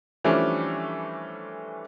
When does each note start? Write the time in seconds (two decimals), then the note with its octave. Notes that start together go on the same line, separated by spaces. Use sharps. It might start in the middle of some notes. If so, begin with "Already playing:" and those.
0.24 E3 F3 G3 A3 C#4 D4